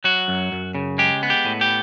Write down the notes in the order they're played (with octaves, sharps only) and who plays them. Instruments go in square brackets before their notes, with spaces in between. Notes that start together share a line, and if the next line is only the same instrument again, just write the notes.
[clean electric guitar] F#3 F#4
F#2
F#2
C#3
G#3 G4
B3
G4
A2
G4